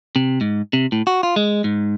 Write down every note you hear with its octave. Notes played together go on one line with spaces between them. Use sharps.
C3
G#2
C3
A2
F#4
F4
G#3
G#2